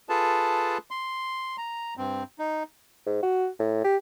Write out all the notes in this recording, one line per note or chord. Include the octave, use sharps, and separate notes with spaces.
F4 G#4 A4 B4 A5
C6
A#5
G2 C4
D#4
G#2
F#4
A2
G4